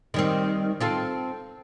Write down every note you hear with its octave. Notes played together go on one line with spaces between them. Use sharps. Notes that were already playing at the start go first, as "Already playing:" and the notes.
D#3 G3 C4
C4 F4 A4